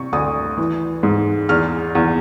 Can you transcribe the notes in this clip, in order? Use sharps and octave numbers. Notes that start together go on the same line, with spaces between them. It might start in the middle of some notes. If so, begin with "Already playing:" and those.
Already playing: C3 C#6
D2 D#6
E3
G#2
E2 F6
E2